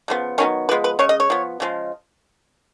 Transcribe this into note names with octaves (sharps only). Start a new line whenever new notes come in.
C#3 F3 B3
D#3 F#3 B3 C#4
F3 G#3 B3 B4
B4
C#3 G#3 C#5
D#5
C#5
F3 B3
C#3 F3 G#3